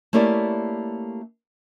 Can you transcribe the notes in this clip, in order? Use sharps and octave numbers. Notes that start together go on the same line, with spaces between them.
A3 A#3 C#4 E4 G4 D5